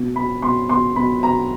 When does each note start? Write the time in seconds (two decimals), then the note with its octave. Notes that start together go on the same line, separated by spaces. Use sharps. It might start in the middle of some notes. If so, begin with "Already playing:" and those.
Already playing: B2
0.15 B2 B5
0.42 B2 C6
0.69 B2 C6
0.96 B2 B5
1.23 B2 A#5